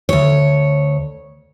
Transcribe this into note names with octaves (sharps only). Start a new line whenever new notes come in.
D2 C#5